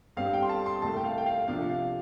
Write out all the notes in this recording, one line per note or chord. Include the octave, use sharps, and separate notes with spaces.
G2 G3 C4 F5
G5
C6
A5
C6
C2 C3 A3 A5
G5
F5
G5
F5
C3 F3 D4 F5
F5